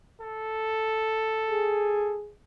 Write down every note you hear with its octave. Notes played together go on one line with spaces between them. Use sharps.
A4
G#4